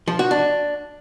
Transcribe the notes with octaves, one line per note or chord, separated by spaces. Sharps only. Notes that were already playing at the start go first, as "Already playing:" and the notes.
F3
F#4
D4